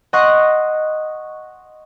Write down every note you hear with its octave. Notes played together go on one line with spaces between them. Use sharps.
D#5 F#5 C6 C#6 F#6 A#6